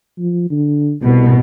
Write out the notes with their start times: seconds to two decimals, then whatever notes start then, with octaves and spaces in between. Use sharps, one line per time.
0.19 F3
0.51 D3
1.02 C2 B2